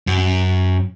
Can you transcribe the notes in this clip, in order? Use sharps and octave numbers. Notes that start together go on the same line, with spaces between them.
F#2